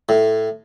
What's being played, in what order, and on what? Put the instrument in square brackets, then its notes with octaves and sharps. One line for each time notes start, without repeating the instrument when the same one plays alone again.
[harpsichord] A2